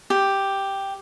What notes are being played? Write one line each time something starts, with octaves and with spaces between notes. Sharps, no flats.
G4